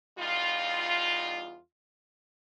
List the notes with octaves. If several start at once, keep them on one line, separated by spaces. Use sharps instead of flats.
E2 G3 D#4 F4